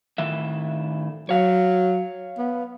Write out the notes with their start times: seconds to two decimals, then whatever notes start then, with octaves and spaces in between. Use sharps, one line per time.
0.18 A2 D#3 E5
1.29 F#3 C#5 F5
2.38 B3